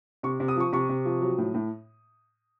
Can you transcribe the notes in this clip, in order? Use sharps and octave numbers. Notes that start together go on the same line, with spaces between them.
C3 C#6
C3
D#6
F3 C#6
C3 C#6
C3
F3
F#3
A2
A2